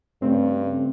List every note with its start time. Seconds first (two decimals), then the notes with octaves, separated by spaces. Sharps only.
0.22 G2 C#3 A3 C4